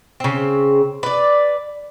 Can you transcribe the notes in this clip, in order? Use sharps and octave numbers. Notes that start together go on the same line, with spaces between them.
C#3 C4
B4 D5